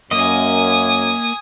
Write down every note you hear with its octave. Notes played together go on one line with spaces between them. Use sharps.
F#2 A#3 D#5 G#5 D#6